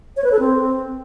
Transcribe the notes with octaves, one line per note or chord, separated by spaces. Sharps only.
C#5
B4
A4
C4